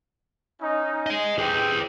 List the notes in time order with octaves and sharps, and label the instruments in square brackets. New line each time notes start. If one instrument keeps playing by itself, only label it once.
[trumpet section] C#4 D#4
[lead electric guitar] D#5 G#5
[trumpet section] C4 G4 G5 [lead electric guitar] G#4 B4